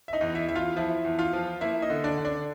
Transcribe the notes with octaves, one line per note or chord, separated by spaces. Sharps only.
E5
D#4 D#5
E2
E4 E5
E2 E5
F4 F5
F3 E4 E5
E2
F4 F5
F3
A#3 E4 E5
D#4 D#5
D3
D4 D5
D3
D4 D5